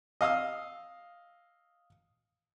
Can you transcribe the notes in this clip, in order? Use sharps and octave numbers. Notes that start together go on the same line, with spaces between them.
D#5 F5 D#6 E6